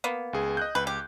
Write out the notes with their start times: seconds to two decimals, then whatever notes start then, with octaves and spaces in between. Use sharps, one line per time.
0.04 A#3 B3
0.33 C#2 G#4
0.57 D#5 F#6 G6
0.75 C#2 B4
0.87 G4